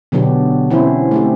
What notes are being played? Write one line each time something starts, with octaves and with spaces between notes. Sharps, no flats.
B2 D3 F#3 B3 D4 G4
E3 C4 C#4 E4 C5
A3 C4 G4